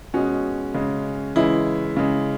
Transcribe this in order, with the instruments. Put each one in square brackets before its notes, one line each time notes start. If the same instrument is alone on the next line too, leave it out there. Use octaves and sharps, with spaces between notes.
[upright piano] B2 G#3 C#4 F#4
C#3 G#3
C#3 E3 G#3 E4
C#3 G#3